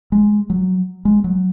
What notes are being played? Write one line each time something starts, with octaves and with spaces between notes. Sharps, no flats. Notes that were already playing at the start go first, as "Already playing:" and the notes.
G#3
F#3
G#3
F#3